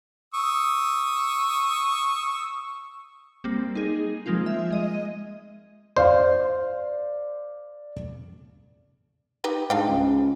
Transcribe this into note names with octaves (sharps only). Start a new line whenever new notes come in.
C#6 D#6 E6
G3 A#3 C4
D#4 G#4
F3 G#3 A#3 C4 F4
E5
G#3 D#5 D#7
C5 D5 F5
D#4 G4 B4
G#2 D4 F5 G5
C#2